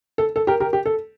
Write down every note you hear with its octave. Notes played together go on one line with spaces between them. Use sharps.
A4
A4
G4 A#4
G4 A#4
G4
A4